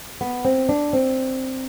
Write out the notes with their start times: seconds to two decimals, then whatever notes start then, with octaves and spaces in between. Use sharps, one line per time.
0.21 B3
0.45 C4
0.69 D4
0.93 C4